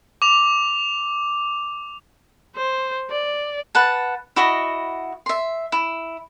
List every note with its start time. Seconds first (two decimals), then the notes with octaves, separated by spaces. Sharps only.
0.22 D6 F7
2.56 C5
3.11 D5
3.75 B4 F#5 A5
4.36 E4 F#4 D#5 B5
5.26 E5 C6
5.72 E4